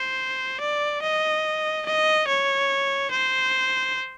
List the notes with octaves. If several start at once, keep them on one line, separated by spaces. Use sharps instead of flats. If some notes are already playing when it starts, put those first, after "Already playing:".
Already playing: C5
D5
D#5
D#5
C#5
C5